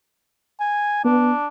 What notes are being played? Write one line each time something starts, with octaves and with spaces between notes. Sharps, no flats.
G#5
B3 D4